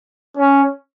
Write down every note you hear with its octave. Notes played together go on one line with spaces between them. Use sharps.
C#4